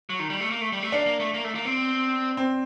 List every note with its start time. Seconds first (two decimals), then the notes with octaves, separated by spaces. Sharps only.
0.09 F#3
0.19 D#3
0.30 G3
0.40 A3
0.50 A#3
0.61 A3
0.72 G3
0.82 A3
0.92 A#3 D4
1.06 A#3
1.20 A3
1.34 A#3
1.44 A3
1.55 A#3
1.65 C4
2.37 C4